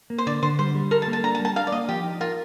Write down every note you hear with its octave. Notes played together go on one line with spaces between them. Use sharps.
A#3
C5
D3 D5
D3 C5
G3 C5
G3
A4 A#4
A5
A#3
A5
D4 A#5
A5
G3
A5
D4 F5
D5
A#3 D#5
F3 G4
D#4
F4 A#4